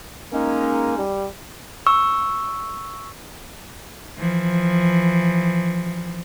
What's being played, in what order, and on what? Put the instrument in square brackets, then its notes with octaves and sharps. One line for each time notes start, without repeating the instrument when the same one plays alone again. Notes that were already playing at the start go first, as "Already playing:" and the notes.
[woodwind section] G#3 C#4 D#4 [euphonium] A#3
[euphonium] G3
[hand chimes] C#6 E6
[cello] E3 F3